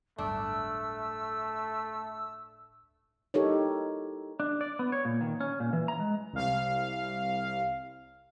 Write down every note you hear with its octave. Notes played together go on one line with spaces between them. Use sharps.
D1 G1 A3 D4 E6
D#4 E4 G4 A4 A#4 C#5
D4
D5
B3
C#5
A#2
D#3
C#4
A#2
E3
A#5
G#3
C2 F5